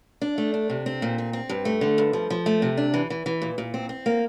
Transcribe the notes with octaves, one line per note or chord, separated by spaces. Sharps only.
D4
A3
D4
C3
C4
A#2
C4
C4
G2
A3
D3
G2
F3
F3
A3
C3
D4
E3
E3
E3
A#2
A#2
C4
C4
A#3